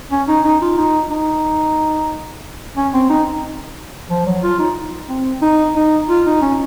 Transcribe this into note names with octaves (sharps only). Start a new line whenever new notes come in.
C#4
D#4
D#4
F4
D#4
D#4
C#4
C4
D#4
F3
F#3
F4
D#4
C4
D#4
D#4
F4
D#4
C#4